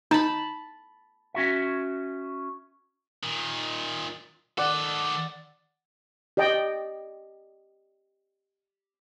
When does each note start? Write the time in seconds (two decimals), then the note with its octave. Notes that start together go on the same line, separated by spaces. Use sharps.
0.11 D#4 A5 B5
1.34 C#4 F#4 E5
3.23 A#2 D#3
4.58 D#3 A4 D5 F#5
6.37 G4 D5 D#5 G5